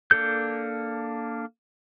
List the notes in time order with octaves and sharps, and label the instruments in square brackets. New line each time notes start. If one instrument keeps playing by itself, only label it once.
[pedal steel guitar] A#3 D4 A4 G6